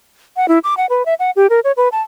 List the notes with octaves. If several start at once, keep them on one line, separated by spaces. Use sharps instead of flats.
F#5
E4
D6
F#5
B4
E5
F#5
G4
A#4
C#5
B4
A5